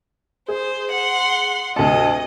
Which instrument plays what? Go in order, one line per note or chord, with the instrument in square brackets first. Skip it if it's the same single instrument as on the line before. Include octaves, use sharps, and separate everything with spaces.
[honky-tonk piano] G#4 [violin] C5
[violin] F#5 C6
[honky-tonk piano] D2 C3 A5 [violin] D#5